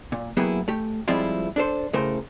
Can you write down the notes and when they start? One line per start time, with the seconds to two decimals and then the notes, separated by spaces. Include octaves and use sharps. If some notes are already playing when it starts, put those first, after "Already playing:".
0.12 A#2
0.37 F#3 A#3 B3 E4 G4 G#4
0.68 A3 G4
1.08 F3 G3 G#3 C4 E4 F4
1.56 D4 A4 C5
1.93 A2 C#3 A3 A#4 C5